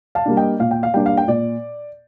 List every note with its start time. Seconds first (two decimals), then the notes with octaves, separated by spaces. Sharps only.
0.15 F5 A5
0.26 G3 A#3 D4
0.37 D#5 G5
0.59 A#2 F5
0.71 G5
0.83 F5
0.94 G3 A#3 D4 G5
1.06 F5
1.17 G5
1.27 A#2 D5